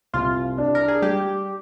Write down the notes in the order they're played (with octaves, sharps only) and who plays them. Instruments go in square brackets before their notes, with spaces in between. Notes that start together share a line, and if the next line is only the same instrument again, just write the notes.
[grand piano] C2 [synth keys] F4
[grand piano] D4
[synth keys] A#4
G#4
[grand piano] G3 [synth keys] G4